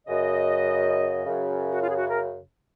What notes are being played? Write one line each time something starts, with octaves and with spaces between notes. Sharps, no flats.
F#2 C#3 D#5
F#2 C#3
F#4
F4
G#4
F#4
A#4